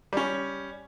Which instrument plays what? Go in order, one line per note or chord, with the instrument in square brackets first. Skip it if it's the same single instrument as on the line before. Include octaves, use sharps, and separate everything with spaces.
[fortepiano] G3 C#4